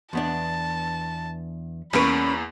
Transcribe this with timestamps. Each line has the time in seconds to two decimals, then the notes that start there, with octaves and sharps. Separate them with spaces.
0.13 E2 B3 D4 A5
1.93 E2 A#3 C#4 B4 B5 D7